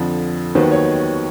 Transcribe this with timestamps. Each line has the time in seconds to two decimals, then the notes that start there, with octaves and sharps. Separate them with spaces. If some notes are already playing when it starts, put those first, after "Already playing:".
Already playing: F2 D3 F3
0.55 D#2 D#3 F#3 B3 C5
0.71 C#5